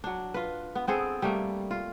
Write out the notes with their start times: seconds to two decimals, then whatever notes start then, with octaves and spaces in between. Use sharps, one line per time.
0.04 F#3 D4
0.34 F4 B4
0.75 B3
0.87 B3 C4 G#4 A4
1.22 G3 A3 A#3
1.71 F4